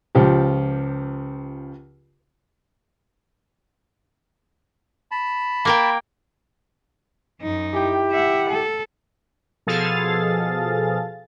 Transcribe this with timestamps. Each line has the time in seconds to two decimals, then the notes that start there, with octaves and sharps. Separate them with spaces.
0.15 C#2 F3 G4
5.11 A5 B5
5.65 A#3 A#4 G5
7.42 F#2 D#4
7.74 E4 G4 G5
8.12 E5 F#5
8.49 A4
9.67 B2 F3 G#4 A4 F5 A6